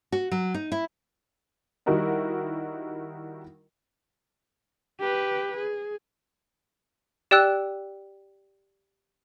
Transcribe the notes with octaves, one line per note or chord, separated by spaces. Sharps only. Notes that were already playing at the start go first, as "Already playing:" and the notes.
F#4
F#3
D#4
E4
D#3 G3 E4 F#4 A#4 D#5
G4 B4
G#4
G4 D5 G5 E6 F#6